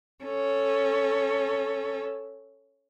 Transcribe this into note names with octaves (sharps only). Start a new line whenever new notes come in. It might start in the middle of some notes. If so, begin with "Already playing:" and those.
C#4 A4